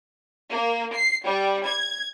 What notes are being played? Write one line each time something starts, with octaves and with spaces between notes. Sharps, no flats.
A#3
C7
G3
G#6